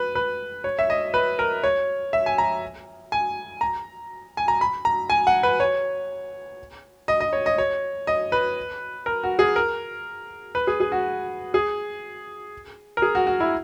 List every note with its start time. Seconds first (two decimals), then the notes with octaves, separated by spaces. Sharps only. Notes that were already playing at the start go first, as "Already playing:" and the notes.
Already playing: B4
0.15 B4
0.64 C#5
0.79 E5
0.90 D#5
1.14 B4
1.39 A#4
1.64 C#5
2.13 E5
2.26 G#5
2.38 A#5
3.12 G#5
3.61 A#5
4.37 G#5
4.48 A#5
4.61 B5
4.85 A#5
5.10 G#5
5.27 F#5
5.43 B4
5.60 C#5
7.08 D#5
7.20 D#5
7.33 C#5
7.46 D#5
7.58 C#5
8.07 D#5
8.32 B4
9.06 A#4
9.23 F#4
9.39 G#4
9.56 A#4
10.55 B4
10.67 G#4
10.80 G#4
10.92 F#4
11.54 G#4
12.97 A#4
13.02 G#4
13.15 F#4
13.27 F#4
13.40 E4